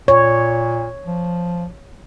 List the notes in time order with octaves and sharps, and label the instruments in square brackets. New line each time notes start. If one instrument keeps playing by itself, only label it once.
[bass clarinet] A#2 [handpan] C#5
[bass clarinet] F3